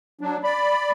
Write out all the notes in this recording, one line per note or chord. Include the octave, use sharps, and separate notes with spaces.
F#3 D4
D5 B5